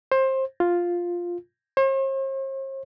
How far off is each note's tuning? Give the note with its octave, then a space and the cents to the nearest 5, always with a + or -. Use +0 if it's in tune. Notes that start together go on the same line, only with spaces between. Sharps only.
C5 +20
F4 +5
C5 +45